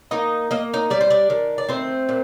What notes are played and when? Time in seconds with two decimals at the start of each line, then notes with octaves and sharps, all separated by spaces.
0.11 A#3 D#4 D#5
0.51 A#3 D#5
0.74 D#4 D#5
0.90 G3 D5
1.01 C5
1.10 D4 D5
1.30 D#3
1.58 D5
1.69 A3 C4 C5
2.09 A#2